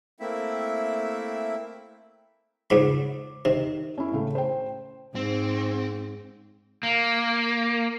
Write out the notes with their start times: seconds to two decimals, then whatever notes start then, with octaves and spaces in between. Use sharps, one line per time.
0.20 A3 A#3 C4 E4 E5
2.70 C#2 G#2 B5 D6
3.45 C3 D#3
3.98 C#4 E4
4.12 A2 C#3 A3
4.35 C5 G5
5.15 G#2 C4
6.83 A#3